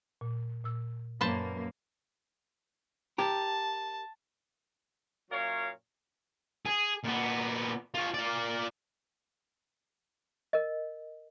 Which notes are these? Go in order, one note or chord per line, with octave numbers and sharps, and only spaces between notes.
A#2
A#2 E6
F#2 A#3 B4 C5 A5
G4 A#4 A5
F#2 A#2 F#3 A#4 C#5 F5
G#4
A#2 B3
F4 C#5
F4 D5
A#4 D#5